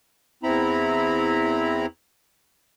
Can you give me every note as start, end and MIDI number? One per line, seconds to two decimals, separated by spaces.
0.43 1.86 40
0.43 1.86 60
0.43 1.86 64
0.43 1.86 82
0.43 1.86 83